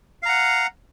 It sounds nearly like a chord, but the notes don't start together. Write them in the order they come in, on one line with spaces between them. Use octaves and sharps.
F5 A#5 F#5